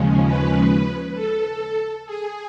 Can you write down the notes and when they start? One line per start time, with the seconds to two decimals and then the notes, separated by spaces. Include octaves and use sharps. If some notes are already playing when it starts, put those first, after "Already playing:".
Already playing: D#2 C#3 F3 G#3 C#4
0.26 B4
1.15 A4
2.06 G#4